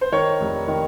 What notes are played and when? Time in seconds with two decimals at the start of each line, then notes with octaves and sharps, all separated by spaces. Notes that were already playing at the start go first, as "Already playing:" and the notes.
0.01 C5
0.12 D#3 A#4 C#5
0.41 F1
0.68 D#3